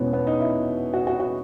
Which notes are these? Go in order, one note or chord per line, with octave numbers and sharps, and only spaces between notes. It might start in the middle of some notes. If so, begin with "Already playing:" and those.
Already playing: E2 B2 G#3 B3 C#4
B3
D#4
E4
F#4
F#4
F#4